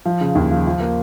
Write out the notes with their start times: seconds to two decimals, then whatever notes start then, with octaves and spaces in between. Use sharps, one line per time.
0.06 F3
0.21 C#3
0.35 D#2
0.51 F3
0.67 F3
0.80 A#3